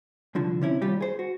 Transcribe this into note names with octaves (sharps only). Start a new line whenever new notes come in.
C2 D3 F3
C3 C#4 E4
D#2 G3 F4 G4
G#4 C5
F#4